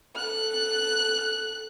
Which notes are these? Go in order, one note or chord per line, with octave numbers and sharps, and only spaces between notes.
A4 F#6